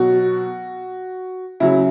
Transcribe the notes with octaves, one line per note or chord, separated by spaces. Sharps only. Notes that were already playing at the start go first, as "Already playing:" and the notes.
Already playing: B2 F#3 F#4
C#3 F#3 E4